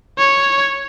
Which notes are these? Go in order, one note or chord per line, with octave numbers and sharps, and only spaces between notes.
C#5